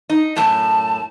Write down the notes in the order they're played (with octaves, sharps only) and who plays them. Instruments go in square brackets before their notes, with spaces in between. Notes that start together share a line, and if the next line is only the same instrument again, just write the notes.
[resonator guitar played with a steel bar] D#4
[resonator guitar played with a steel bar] F#2 A2 [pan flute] A5